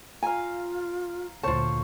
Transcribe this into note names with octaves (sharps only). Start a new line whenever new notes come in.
F4 F5 G#5 A#5
D2 A#2 F4 C5 C#5 A5